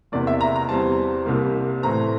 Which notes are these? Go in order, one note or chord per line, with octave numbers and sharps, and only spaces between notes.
E2 C3 E3 A#3 D5
E5
A#5
A#5
E2 E3 G3 C4 A5
C2 C3 G3 A#3
A2 E3 A3 C4 A#5